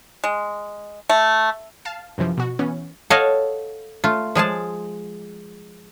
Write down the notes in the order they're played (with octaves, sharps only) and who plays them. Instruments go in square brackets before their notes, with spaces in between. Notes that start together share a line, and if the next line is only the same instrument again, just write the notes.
[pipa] G#3
A3
[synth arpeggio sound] F5 A5
F#2 C3 E3 F3
B2 F#4
E3 B3 C#4
[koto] A4 C#5 D#5 F5 F#5 A5
A3 F4
F3 G#3 G#4 A5